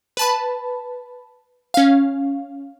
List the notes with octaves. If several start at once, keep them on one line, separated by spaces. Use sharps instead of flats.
B4 A5 B5
C#4 F5